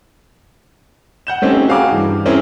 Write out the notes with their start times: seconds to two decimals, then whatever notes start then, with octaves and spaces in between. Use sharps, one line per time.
1.27 F#5 G6 E7
1.42 A3 C4 C#4 D#4 G4
1.68 F#4 G#4 F5 G5 A#5 D6
1.91 G2 E3
2.26 C4 C#4 E4 G#4 A#4